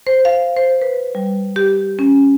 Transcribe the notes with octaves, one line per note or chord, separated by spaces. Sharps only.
C5
F5
C5
B4
G3
G4
C#4